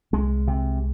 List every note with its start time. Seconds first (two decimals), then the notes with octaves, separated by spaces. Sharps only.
0.13 C2 G#3
0.48 C3